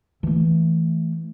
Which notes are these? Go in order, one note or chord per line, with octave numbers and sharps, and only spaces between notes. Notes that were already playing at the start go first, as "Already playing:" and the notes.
E3 A3